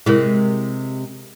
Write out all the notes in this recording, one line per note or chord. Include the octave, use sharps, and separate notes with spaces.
C3 G#3 E4 A#4